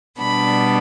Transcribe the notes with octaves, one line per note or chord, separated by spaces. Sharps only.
B2 G3 B3 D4 B5